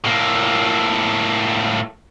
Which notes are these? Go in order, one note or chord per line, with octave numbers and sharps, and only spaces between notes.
A2 A#3